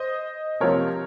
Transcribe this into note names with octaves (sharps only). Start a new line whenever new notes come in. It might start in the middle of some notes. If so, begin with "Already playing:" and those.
Already playing: C5 D#5
C3 F3 A#4 C#5